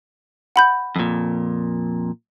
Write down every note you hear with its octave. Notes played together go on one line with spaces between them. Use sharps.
F#5 B5 G6
F2 A#2